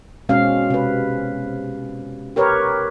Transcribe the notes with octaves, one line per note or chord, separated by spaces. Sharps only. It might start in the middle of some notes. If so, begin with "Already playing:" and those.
B2 G#3 C4 C#4 F5
C3 B4
G4 A#4 B4 C#5